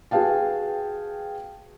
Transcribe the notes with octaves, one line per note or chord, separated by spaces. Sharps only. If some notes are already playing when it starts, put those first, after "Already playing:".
F#4 G#4 B4 F5 G5 A5